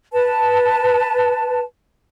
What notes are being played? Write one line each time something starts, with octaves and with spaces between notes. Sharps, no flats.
B4 A5